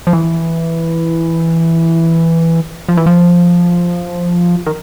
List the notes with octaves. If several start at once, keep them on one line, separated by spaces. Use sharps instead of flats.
F3
E3
F3
E3
F3
D#3